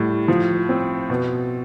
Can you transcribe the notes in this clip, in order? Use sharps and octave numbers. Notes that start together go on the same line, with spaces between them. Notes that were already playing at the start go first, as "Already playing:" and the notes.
Already playing: A2 G3
F3
C4
B2